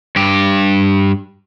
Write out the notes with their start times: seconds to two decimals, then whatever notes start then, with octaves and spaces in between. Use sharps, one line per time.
0.16 G2 G4